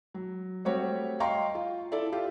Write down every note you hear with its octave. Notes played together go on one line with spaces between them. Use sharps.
F#3
G3 A3 C4 F#4 G4 C#5
D#5 F5 G5 A#5 C6 C#6
F4
E4 A4 D5 E5
F4 G4